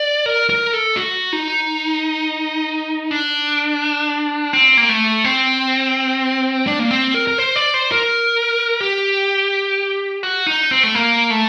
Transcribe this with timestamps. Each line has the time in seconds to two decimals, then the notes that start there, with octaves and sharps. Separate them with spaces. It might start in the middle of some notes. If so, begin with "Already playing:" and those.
Already playing: D5
0.26 A#4
0.50 A#4
0.73 A4
0.97 F#4
1.33 D#4
3.11 D4
4.53 C4
4.77 A#3
4.89 A3
5.24 C4
6.67 D4
6.79 A#3
6.91 C4
7.15 A#4
7.27 A#4
7.38 C5
7.56 D5
7.74 C5
7.92 A#4
8.80 G4
10.23 F#4
10.47 D#4
10.71 C4
10.84 A3
10.95 A#3
11.30 A3